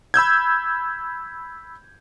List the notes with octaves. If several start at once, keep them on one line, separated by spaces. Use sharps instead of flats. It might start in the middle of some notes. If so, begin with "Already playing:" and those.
B5 E6 G6 G#6